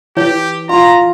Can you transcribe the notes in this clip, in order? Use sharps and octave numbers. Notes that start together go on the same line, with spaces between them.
E3 E4 G4 C#5
F4 A#5